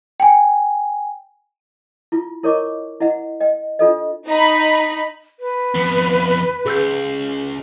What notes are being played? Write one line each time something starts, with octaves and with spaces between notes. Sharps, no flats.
G5 G#5
E4 F4
E4 A#4 C#5 D#5 C#6 D6
E4 D#5 F#5
D#5 G5
D4 F4 A4 D#5
D#4 B5
B4
F2 B3
C#2 G#4 E6 G6